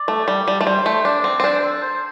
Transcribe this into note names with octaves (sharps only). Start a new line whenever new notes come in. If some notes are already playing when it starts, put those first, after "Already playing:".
Already playing: D5
A3
G3
G3
A3
G3 C5
A3
D4 D5
C4
C4
D4 C5
C5
A4
C5